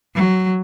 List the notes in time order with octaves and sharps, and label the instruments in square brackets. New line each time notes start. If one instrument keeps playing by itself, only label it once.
[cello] F#3